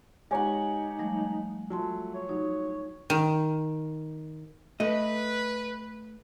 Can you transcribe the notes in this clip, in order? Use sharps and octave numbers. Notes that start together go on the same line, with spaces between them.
G#3 D#4 G4 C#5 F#5 G#5 A#5
F3 G3 A3
F#3 A3 F4 A5 C6
C#5
F#3 D#4
D#3
A3 B4 D#5